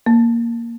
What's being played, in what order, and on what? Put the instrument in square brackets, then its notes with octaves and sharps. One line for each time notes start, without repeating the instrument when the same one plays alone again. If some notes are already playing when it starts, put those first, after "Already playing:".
[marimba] A#3